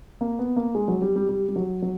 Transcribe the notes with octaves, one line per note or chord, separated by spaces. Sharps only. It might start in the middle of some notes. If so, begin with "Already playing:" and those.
A#3
B3
A#3
G#3
F#3
G3
G3
G3
G3
F#3
F#3